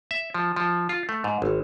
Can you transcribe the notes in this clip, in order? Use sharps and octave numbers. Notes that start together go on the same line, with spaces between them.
E5
F3
F3
F4
A3
G#2
G#1